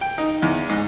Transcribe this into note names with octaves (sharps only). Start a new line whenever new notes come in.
G5
D#4
E2
G#2